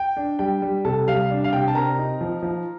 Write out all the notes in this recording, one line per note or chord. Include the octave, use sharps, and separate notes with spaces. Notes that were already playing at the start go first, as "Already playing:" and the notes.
Already playing: G5
D4
G3 G5
G3
C3 A4 A5
G3 F5
D4
F5
C3 G5
A5
C4 A#4 A#5
D#4
F3
F3